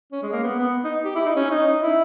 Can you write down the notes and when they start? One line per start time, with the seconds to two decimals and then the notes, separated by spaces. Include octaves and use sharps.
0.12 C#4
0.23 G#3
0.32 A#3
0.43 B3
0.59 B3
0.84 D#4
1.05 G4
1.15 E4
1.26 D#4
1.36 C#4
1.51 D#4
1.67 D#4
1.82 E4